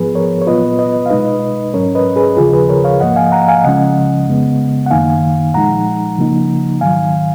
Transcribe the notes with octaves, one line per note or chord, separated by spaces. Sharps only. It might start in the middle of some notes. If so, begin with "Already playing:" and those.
Already playing: G#2 F3 B3 G#4 B4
A#4 C#5
C#5
A#2 F#3 B3 F4 B4 D#5
B4 D#5
F5
B2 G#3 D#4 B4 D#5
G#2 F#3 C#4 A#4 C#5
B4 D#5
G#4 B4
D#2 C#3 F3 F4 G#4
G#4 B4
A#4 C#5
C#5 F5
G#2 F3 A#3 D#5 F#5
F5 G#5
F#5 A#5
F5 G#5
C#2 C#3 F3 G#3 C#4 D#5 F#5
F2 C#3 G#3 B3
F#5
F#2 D#3 A#3 D#4 F5 G#5
A#2 F3 G#3 D#4 F#5 A#5
C#3 F3 A#3 D#4
G#2 D#3 F#3 F5 G#5